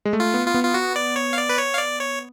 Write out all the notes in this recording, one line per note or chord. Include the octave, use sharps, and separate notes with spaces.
G#3
A3
F4
B3
F4
B3
F4
F#4
D5
C#5
F5
D5
B4
C#5
F5
D5
C#5